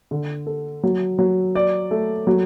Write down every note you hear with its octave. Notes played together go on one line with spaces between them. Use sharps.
D3
A4
F#3
F#3
D5
A3
F#3